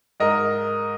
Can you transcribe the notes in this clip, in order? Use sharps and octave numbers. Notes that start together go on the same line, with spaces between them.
G#2 A#4 D#5